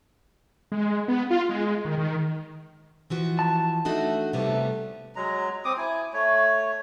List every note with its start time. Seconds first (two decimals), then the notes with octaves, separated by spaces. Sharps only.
0.72 G#3
1.08 B3
1.30 F4
1.49 G#3
1.85 D#3
1.98 D#3
3.10 E3 F3 F#4
3.39 A5
3.85 A3 D4 D#4 F#4
4.33 C3 G3 A3 B3
5.16 F#3 G#3 A#5
5.65 C4 D6 D#6
5.77 E4 G#5
6.13 A3 C#5